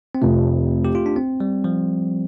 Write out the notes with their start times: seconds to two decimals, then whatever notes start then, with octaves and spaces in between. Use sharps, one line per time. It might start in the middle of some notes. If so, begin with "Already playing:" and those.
0.15 C4
0.21 F1 F2 C3 A3
0.85 G4
0.95 F4
1.06 D4
1.16 C4
1.40 G3
1.64 F3